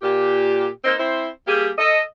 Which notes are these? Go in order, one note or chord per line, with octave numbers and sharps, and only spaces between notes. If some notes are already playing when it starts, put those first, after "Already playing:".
A#2 G4
A#3 C4 D#4 C5
C4 E4 C5
G3 A#3 G4 G#4
A4 D#5